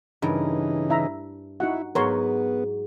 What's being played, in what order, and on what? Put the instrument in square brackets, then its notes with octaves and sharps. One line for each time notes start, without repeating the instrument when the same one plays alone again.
[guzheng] G2 A#4 [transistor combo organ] C#3 E3 D#4
[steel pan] E4 E5 A#5
[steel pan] D#4 F#4 F#5 [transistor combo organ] E4
[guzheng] G#2 F#3 [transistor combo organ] B3 [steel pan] A#4 C#5 C6